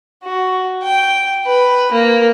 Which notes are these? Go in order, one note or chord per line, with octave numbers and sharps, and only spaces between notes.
F#4
G5
B4
A#3